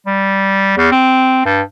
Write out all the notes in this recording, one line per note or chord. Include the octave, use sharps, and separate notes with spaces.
G3
E2
C4
G2